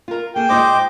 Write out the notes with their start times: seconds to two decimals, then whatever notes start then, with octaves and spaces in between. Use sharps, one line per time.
0.08 F4 A#4
0.36 A#3 G#4 A4 G5
0.49 A#2 G#3 D#4 C5 D#5 D6